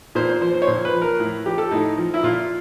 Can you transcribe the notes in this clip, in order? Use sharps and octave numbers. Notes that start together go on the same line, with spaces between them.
A#2 C5
C5
F3 C5
C5
C#5
A#2 C5
B4
F3
A#4
A2
F3 G4
A4
A2 D#4
F3
E4
A#2 F4